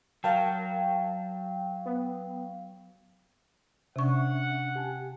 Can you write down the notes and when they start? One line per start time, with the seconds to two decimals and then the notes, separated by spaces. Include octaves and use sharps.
0.24 F#3 A#4 F5 G5 A5
1.86 B3
3.96 C3 C#4 D4 E5 F#5 C#6
4.76 G4 G#5 A5